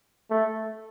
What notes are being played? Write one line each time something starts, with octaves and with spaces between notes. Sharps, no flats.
A3